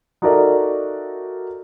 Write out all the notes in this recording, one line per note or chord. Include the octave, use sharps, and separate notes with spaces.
D#4 F#4 A4 A#4 D5 E5